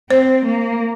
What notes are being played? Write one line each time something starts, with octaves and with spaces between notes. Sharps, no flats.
C4 C5
A#3